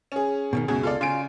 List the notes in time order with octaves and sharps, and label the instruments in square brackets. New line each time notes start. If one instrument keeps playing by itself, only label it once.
[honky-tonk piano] C#4 G#4
[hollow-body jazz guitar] B2 D3 D#3
[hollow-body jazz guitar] C#2 B2 G#4 [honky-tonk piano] F#2
[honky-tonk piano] F4 A4 D5
[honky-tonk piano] C#3 G#5 D7 [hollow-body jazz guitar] F4